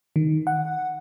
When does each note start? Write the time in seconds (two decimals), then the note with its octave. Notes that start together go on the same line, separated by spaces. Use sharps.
0.16 D#3
0.47 F#5